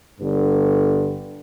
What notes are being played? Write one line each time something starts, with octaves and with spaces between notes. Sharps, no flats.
G1 G2 D3